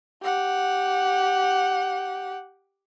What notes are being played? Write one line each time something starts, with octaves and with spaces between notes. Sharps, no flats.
G4 F#5